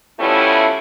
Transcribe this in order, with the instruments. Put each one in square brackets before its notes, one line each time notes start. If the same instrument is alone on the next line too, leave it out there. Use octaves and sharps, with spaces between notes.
[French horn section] F3 G3 A3 B3 C#4 E4